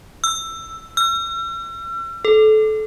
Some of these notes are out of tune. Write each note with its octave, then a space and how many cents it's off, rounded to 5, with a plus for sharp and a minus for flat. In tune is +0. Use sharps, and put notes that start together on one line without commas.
E6 +15
E6 +45
A4 -25